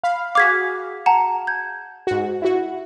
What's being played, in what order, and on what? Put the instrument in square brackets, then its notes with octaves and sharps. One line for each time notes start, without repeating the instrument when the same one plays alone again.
[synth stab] F5 B5
[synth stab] F#4 G#4 F5 [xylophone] D6 G#6 B6
[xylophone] F#5 A5 A#5
G6 G#6
[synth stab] G#2 F#4
E4 F#4